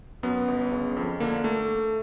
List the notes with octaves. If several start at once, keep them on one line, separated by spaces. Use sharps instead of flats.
F#2 B3
G1
C#3
F2
D3 A#3
A3